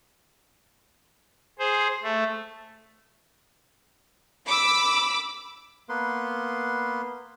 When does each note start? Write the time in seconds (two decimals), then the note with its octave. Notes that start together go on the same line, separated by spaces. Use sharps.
1.59 G#4 C5
2.03 A3
4.46 B5 D6 E6
5.89 A#3 B3 B4 C6